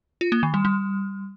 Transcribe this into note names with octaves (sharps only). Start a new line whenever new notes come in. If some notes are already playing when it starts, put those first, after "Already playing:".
F4
A#3
D#3
G3
G3